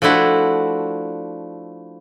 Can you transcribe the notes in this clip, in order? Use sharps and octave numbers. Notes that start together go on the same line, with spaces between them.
F3 A3 D4 E4 F#4